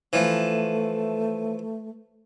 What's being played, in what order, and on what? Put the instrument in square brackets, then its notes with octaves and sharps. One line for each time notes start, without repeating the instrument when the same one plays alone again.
[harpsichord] E3 F3 [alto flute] A3